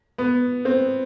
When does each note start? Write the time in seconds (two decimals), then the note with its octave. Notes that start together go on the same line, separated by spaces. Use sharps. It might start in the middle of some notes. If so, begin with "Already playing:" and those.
0.18 B3
0.65 C4